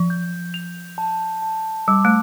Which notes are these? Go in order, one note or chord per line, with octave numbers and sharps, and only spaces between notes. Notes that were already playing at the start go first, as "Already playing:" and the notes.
Already playing: F3
G6
F7
A5
A5
G3 D6
A3